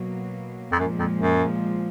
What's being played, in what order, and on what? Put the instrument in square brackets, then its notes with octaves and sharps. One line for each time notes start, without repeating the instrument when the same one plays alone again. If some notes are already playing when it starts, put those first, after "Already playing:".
Already playing: [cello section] B2 F#3 A#3
[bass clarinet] F2
[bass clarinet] F#2 [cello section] A#2 F3 G#3
[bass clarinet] F2
F#2